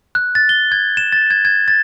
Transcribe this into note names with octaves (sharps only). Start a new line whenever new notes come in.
F#6
A6
G7
G#6
E7
A6
G#6
G#6
A6